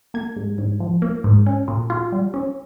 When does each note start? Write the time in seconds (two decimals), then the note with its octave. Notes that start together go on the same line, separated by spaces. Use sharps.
0.14 A#3 G#6
0.36 G#2
0.58 G#2
0.80 F3
1.02 A#3
1.24 G#2
1.46 C#4
1.68 A#2
1.90 F4
2.12 G3
2.34 C#4